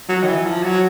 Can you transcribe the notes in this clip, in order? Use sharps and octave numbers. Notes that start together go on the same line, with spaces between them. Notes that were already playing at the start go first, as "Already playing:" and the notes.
F#3
D#3
E3
F3
F#3